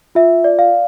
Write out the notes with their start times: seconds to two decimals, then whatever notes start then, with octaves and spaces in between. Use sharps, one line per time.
0.15 F4 E5
0.44 D5
0.59 F5